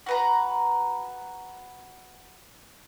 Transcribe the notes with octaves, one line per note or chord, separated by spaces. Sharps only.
F#4 B4 A#5